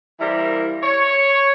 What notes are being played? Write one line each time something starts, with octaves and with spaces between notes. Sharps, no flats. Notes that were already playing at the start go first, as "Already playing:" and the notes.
E3 G3 A#3 E4 A#4 C5
C#5